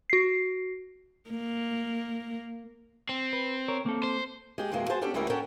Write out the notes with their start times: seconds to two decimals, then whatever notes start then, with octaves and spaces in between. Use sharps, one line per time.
0.10 F#4 C7
1.30 A#3
3.09 C4
3.33 B4
3.68 A#4 C#5
3.86 A#3 C4 A4
4.04 C5
4.58 G#3 G4
4.72 F2 B2 E3 G#3 A#3
4.89 F#4 G#4 C5 A5
5.01 B3 C#4 D4 G4 A4
5.14 D2 G3 G#3 C#4 E4 A#4
5.30 C#4 A4 A#4 F#5 G5